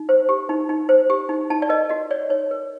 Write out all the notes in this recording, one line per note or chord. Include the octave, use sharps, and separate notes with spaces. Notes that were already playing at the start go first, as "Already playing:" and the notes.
Already playing: D#4
C5
G4
D#4
D#4
C5
G4
D#4
D#4 A5
D5
A#4 D#5
F#4 D#5
C#5 D5
D#4 C#5
A#4